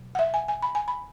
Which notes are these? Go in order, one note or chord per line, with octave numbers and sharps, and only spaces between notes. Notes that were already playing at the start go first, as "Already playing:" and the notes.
Already playing: B2 F#3
F#5
E5
G#5
G#5
B5
G#5
B5